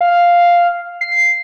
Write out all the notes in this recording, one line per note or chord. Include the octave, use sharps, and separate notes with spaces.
F5
C7